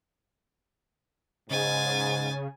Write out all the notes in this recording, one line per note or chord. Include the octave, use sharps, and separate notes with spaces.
G#2 C#3 G#5 A6